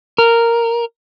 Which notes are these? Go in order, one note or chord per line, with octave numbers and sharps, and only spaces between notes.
A#4